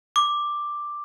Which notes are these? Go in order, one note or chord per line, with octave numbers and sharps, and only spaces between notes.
D6